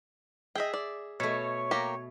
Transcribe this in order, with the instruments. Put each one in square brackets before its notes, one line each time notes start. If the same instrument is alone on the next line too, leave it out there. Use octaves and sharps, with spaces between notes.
[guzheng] G#4 E5 [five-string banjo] D#5 G5
[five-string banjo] D5
[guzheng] B2 A3 [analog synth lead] C#5
[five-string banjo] A#3 G4 A#5